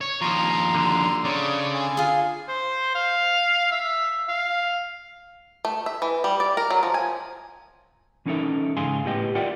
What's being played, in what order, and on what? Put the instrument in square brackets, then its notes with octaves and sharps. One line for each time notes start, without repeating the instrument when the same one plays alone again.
[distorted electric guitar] C#5
[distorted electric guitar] D#2 F3 [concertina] A#5 C6
[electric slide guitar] D3
[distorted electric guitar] C#3 [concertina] D5 C#6
[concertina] G#5
[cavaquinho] F4 G#4
[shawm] C5
F5
E5
F5
[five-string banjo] A3
E5
E3
G3
D5
A#4
F#3
F3
G#5
[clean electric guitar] E3 C#4 D#4 A4 A#4 E5
G#2 C#3 G#4 F5 G#5 C6
A2 B3 G4 D#5 G5
F4 A#4 D5 E5 F#5 G5